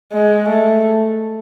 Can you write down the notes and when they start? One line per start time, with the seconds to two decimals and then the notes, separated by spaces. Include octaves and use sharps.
0.13 G#3
0.49 A3